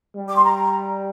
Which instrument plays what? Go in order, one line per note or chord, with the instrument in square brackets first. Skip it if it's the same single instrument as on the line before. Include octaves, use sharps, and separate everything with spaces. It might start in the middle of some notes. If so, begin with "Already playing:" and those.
[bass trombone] G3
[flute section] D6
C6
A#5